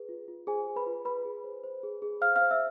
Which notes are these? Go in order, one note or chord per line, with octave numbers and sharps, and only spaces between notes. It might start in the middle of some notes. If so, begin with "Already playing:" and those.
Already playing: G#4 B4
F4
F4
G#4 C5 G#5
G#4
B4 B5
F4
G#4 B4 B5
G#4
C5
C5
G#4
G#4
C5 F5 F6
F5 F6
C5
E5 E6